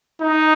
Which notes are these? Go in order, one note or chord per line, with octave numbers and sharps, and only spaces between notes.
D#4